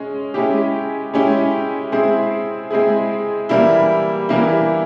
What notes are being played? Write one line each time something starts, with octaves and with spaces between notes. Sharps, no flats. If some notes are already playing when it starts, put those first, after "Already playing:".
Already playing: G#3 C#4
G#3 C#4 E4 G4
G#3 C#4 E4 G4
G#3 C4 E4 G#4
G#3 C4 E4 G#4
E3 G3 A#3 E4
E3 G3 A#3 E4